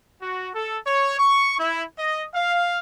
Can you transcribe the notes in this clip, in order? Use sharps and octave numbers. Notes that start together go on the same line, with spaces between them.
F#4
A4
C#5
C#6
E4
D#5
F5